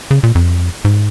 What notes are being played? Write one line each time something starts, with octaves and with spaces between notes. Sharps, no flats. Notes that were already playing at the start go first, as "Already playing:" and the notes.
C#3
A#2
F2
G#2